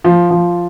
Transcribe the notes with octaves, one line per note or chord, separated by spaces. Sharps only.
F3
F3